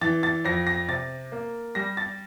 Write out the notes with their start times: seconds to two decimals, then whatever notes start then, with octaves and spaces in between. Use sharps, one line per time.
0.01 E3 A6
0.23 A6
0.45 F2 A#6
0.67 A#6
0.89 C3 A6
1.32 A#3
1.75 G3 A#6
1.97 A6